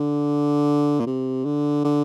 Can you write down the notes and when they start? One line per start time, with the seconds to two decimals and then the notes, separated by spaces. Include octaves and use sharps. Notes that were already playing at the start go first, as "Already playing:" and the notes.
Already playing: D3
1.00 A#2
1.06 C3
1.45 D3
1.84 D3